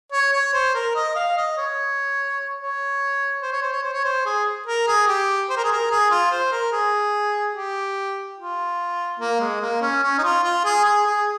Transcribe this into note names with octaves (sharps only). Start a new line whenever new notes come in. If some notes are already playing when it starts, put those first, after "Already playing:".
C#5
C#5
C5
A#4
D#5
F5
D#5
C#5
C#5
C5
C#5
C5
C#5
C5
C#5
C5
G#4
A#4
G#4
G4
C5
A#4
G#4
A#4
G#4
F4
C5
A#4
G#4
G4
F4
A#3
G#3
A#3
C#4
C#4
D#4
F4
F4
G#4
G#4
G#4